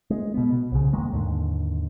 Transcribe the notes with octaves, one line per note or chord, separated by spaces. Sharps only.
G#3
B2 B3
B2
C2 C#3
E1 D#3 G#3 A#3
D#2 G#2 D3